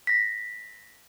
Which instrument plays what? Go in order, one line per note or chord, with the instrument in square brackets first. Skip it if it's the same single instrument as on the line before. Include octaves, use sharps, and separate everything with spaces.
[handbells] A#6 B6